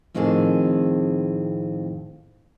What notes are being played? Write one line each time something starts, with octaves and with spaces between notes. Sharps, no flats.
F2 A2 D#3 C4 G#4 A4